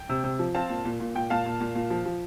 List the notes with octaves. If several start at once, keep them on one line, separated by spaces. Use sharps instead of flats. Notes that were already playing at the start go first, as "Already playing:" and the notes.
Already playing: G5
C3
C3
F3
C4 F5 A5
A#2
A#2
A#2
A#2 G5
A#2 F5 A5
A#2
A#2
A#2
F3
F3